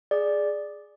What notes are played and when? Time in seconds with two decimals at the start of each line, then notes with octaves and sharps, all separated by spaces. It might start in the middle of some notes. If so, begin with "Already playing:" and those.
0.11 G#4 D5